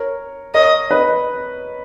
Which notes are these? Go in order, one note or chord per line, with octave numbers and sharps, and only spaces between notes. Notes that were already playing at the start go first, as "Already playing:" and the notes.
Already playing: A#4 C#5
A#4 C#5 D#5
B4 D#5